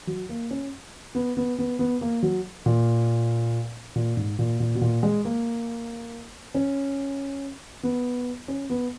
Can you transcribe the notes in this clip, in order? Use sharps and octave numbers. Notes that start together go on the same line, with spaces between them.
F#3
A#3
C#4
B3
B3
B3
B3
A#3
F#3
A#2
A#2
G#2
A#2
A#2
B2
A#2
G#3
A#3
C#4
B3
C#4
B3